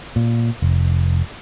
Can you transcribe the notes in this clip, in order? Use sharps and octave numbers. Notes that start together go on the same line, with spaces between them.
A#2
F1